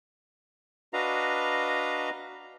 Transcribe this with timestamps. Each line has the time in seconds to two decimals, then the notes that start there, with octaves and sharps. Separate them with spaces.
0.93 D4 F#4 B4 D#5 F5 A#5